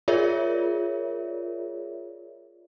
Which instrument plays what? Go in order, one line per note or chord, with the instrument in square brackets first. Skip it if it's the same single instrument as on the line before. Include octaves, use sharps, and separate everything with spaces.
[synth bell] F4 G#4 A#4 C#5 D5 E5